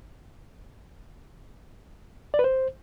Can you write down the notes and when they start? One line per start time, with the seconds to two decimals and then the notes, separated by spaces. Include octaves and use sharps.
2.34 D5
2.39 B4
2.44 C5